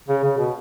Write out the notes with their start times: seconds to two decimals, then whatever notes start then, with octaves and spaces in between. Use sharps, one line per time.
0.08 C#3
0.24 C#3
0.38 B2